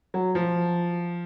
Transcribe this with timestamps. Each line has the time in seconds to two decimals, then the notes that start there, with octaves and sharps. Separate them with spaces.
0.14 F#3
0.35 F3